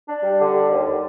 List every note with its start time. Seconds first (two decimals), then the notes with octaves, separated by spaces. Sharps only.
0.07 D4
0.23 G3
0.39 D3
0.54 G3
0.70 D#2